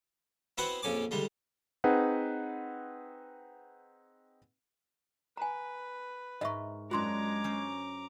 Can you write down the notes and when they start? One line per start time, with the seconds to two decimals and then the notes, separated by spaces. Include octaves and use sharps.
0.58 B3 C4 E4 F#4 B4 F#5
0.82 A#1 F2 C#4 G#5 D6
1.11 D2 G3 G#3
1.84 C4 D#4 G#4 B4 F#5
5.37 B4 G#5 A#5
6.41 G#2 A#4 D#5 E5 C#6
6.91 F#2 G#3 D4 F4 F#5 A#5 C6 D6
7.44 C#4 C5 C#5